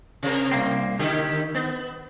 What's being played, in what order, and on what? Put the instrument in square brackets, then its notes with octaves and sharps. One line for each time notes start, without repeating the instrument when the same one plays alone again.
[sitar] C3 A#4
[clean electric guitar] C2 A#3 C4
[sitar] D3 E4 G4 [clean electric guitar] D#3
[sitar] B3